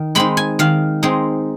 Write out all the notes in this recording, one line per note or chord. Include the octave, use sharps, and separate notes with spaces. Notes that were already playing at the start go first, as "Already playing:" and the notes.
Already playing: D#3
G#3 C4 D#4 B5
G#5
D#3 F5
G#3 C4 D#4